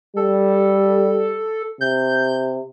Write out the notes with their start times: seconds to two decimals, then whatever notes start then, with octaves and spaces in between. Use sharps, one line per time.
0.17 G3 A4
1.81 C3 G6